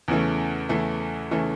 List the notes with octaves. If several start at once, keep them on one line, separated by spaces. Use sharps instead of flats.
E2 C#3 E3 A3
E2 C#3 E3 A3
C#3 E3 A3